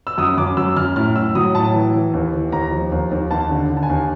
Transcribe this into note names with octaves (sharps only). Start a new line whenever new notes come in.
E6
F#2 D#6
F#2 D6
F#3 E6
F#2 F6
A2 F6
A2 E6
F#3 D#6
A2 A5
E3
E3
D#2
E3
D#2 A#5
F3
D#2
D#2
D#2 A5
D3
D3
A5
G#5
D#2